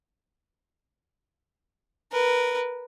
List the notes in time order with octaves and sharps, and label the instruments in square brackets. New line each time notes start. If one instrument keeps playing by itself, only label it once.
[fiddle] A#4 B4